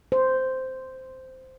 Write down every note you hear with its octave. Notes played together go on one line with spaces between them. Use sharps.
C5